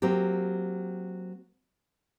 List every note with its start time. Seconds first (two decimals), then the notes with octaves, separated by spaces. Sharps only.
0.02 F#3 A#3 C4 G4